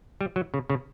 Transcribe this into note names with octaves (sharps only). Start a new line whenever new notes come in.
G3
F#3
C#3
C#3